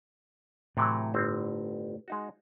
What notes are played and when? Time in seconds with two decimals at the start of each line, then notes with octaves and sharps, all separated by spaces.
0.77 A2 C3 E3 F#3
1.14 G1 C4 C5
2.08 G#3 D#4 F#4